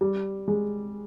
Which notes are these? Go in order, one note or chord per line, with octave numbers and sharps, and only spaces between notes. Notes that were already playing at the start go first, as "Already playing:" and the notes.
G3
G#3